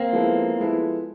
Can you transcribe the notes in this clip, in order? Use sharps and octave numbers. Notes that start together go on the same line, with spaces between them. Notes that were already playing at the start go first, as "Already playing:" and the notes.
Already playing: A#3 C4
F3 G#3 B3 E4 A4
F3 G#3 B3 E4 A4